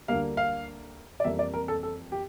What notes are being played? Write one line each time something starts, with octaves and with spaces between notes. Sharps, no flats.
D2 D3 G3 A#3 F5
F5
D5
F2 E3 G3 A#3 E5
D5
A#4
A4
A4
G4